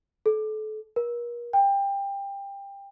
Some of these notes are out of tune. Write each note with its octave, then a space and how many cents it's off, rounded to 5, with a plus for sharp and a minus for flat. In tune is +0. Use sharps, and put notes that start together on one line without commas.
A4 -30
A#4 +40
G5 +20